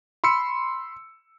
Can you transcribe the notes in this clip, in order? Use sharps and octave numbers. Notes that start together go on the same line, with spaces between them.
B5 C6 E6 C#7